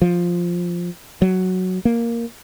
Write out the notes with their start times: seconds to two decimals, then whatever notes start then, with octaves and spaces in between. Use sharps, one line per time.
0.02 F3
1.22 F#3
1.85 A#3